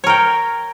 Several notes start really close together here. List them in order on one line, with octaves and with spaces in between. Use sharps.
C#5 A#4 G5